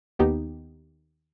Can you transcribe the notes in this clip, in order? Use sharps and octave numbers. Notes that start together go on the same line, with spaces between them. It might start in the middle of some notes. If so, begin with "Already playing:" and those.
D#2 D#3 B3 D#4 G4